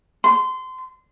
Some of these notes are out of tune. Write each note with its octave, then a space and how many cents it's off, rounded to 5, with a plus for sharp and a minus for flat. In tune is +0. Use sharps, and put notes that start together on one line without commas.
C6 -25